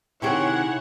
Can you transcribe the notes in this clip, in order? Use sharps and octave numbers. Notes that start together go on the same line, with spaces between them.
C3 D#3 E4 G#4 C#5 F#5 G5 C#6